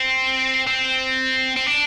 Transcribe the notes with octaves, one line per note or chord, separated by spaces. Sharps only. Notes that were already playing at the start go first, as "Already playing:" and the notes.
Already playing: C4
C4
C4
D4